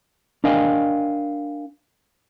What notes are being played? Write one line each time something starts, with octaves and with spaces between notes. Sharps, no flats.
D4 A#4 D#5 F5 G5 G#5